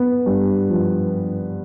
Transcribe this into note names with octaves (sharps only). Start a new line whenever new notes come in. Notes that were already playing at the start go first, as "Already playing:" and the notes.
Already playing: B3
G2
F3